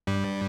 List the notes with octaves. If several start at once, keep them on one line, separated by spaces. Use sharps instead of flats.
G2 G3